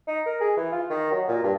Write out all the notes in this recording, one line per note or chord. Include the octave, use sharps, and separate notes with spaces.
D#4
A#4
G#4
E3
F4
D#3
F#3
A#2
G2